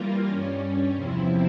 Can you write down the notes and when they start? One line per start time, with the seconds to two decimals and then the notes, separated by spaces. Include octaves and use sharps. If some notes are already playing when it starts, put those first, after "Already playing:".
Already playing: E3 G3 A#3 F4 A#4
0.27 G2 G3 C#4
0.94 E2 C3 F3 C4 E4